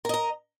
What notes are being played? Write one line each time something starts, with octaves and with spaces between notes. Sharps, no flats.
A#4 D#5 A#5